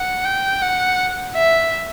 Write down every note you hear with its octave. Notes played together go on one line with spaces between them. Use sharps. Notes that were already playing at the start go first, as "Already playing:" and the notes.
Already playing: F#5
G5
F#5
E5